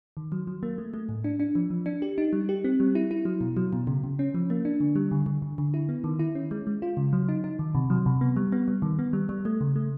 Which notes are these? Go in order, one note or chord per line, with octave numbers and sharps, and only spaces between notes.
D#3
F#3
F#3
A#3
A3
A3
A2
D4
D4
F3
F3
D4
G4
D#4
G3
G4
C4
G3
E4
E4
F#3
B2
F#3
B2
C#3
C#3
C#4
F3
A#3
D4
D3
G3
D3
D3
D3
D3
E4
B3
D#3
E4
C#4
G#3
G#3
F4
C#3
F#3
D#4
D#4
D#3
C3
F#3
C3
B3
G3
B3
G3
D#3
B3
G3
G3
A3
C#3
A3